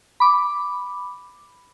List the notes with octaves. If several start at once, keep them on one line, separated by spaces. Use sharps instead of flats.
B5 D6